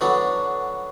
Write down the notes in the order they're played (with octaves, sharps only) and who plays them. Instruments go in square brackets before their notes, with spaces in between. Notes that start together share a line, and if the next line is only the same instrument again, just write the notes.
[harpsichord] D3 F#3 B3 D4